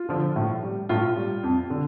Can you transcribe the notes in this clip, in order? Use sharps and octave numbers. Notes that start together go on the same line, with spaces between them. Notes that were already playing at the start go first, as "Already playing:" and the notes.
Already playing: F4
D3 F3
A2
G3
A2 F4
G3
F2
D3